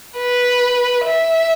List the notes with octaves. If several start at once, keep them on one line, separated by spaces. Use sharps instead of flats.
B4
E5